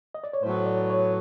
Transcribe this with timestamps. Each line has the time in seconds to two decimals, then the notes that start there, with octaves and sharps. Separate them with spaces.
0.15 D#5
0.24 D5
0.33 C#5
0.43 A2 F#3 B3 C5
0.66 D5
0.90 C#5